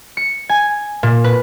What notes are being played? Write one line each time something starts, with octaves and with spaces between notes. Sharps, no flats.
C#7
G#5
A#2
B4